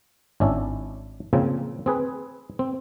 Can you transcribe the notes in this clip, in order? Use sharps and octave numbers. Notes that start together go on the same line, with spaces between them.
G#1 C#4 D4 E4
A#2 C#3 F3 A#3 C4
C4 G#4 B4
C4